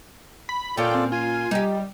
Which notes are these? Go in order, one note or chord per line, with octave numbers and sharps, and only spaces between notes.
B5
A#2 C#4 F4 A4 D5 G5
C4
F4 G#5
G3 D#4 G4